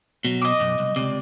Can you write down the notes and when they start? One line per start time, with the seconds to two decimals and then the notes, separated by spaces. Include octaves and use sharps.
0.25 B2 F#3
0.42 D#5 D6
0.60 B1 F#2
0.79 C2
0.96 C#2 C3 D5